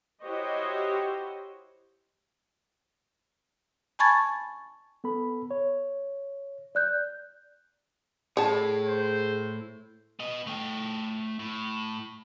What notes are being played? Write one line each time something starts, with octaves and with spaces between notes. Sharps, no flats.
E4 F#4 G4 C5 C#5 D#5
G#5 A5 B5 C#6 G#6 A6
B3 A4 B5
C#5
D5 F#6 G6
A2 G#4 C#5 A5
C5
B3 D#5
A3 G5
A2